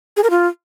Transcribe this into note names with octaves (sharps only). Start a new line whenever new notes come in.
G#4
A#4
F4